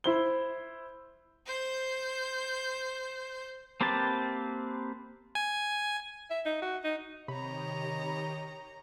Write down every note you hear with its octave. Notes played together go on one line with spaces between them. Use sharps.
E4 C5 G7
C5 G6
A#3 C4 G4 B4 A5
G#5
E5
D#4
F#4
D#4
C3 D#3 G4 C#5 D#5 A#5 B5